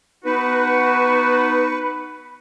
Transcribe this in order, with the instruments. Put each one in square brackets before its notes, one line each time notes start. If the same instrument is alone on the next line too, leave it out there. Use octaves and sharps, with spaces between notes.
[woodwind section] B3 D#4 F#4 [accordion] B4